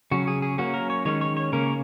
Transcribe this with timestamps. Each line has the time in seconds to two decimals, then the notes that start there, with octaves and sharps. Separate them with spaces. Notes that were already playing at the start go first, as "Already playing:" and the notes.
0.11 C#3 F#3 C#4 F#4
0.27 G#4
0.42 G#4
0.58 F#3 A#3 C#4 F#4
0.74 A#4
0.90 C#5
1.05 D#3 G#3 C#4 C#5
1.21 C#5
1.37 C#5
1.52 C#3 A#3 C#4 A#4